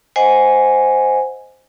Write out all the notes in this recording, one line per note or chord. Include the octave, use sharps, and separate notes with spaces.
C5 D#5 F#5 G#5